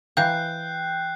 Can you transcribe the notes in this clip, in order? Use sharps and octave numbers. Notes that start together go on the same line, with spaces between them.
E3 F5 G5 A#5 F#6 G6 C7